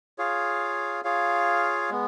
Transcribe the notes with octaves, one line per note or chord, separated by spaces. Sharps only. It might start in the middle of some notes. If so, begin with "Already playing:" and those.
F4 G#4 C#5 F5
F4 G#4 C#5 F5
G#3 B3